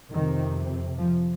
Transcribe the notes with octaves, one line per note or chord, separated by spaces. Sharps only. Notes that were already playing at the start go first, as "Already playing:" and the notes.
F2 C3 D#3
F3